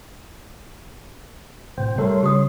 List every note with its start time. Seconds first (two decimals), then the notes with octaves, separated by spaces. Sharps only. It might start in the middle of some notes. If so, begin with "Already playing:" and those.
1.78 A2 C3 C5 G5
1.98 G3 A3 A4 A#4 C#5 C6
2.23 C#3 G4 D#6